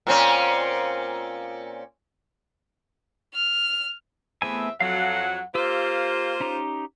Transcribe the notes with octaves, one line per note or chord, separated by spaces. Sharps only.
A#2 C4 C#4
F6
E2 A3 B3 C4 E5 G#5
F2 F#3 F#4 A4 F5 F#5
A#3 F4 G4 C5 E6
C#4 D#4 G4